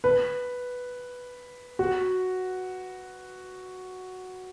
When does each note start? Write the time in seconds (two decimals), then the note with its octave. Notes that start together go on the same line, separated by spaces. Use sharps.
0.04 B4
1.79 F#4